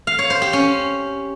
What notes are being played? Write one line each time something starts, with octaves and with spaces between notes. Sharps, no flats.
F5
C#5
C5
G4
C#4